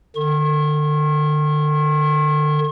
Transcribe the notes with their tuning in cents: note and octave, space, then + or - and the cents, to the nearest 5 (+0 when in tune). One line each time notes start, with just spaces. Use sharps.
D3 +30 C#6 -45